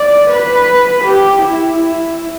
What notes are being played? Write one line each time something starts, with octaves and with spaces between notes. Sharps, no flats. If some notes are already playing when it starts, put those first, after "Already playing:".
Already playing: D5
B4
G4
E4
E4